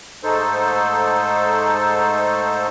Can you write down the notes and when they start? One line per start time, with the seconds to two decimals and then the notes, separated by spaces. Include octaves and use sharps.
0.24 G#2 A3 D#4 A4 C5